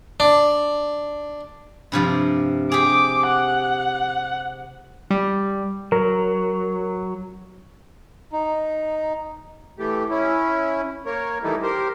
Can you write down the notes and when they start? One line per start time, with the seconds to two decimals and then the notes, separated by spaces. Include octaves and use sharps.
0.20 D4
1.92 G2 C3 F3
2.72 G4 G#4 D6
3.27 F#5
5.11 G3
5.92 F#3 A#4
8.33 D#4
9.79 E3 A3 G4
10.10 C#4 E4
11.06 A#3 A#4 C#5
11.43 D#3 E3 G3 A3 D#4 E4
11.62 G4 A#4 C5